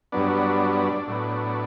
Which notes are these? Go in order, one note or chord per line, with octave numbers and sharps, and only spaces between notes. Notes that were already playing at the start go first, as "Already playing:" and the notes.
G2 F#3 B3 D4
A2 F#3 B3